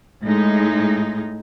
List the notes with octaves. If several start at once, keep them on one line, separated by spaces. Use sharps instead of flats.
A2 G#3 D#4